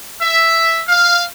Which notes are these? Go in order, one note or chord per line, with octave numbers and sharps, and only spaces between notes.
E5
F5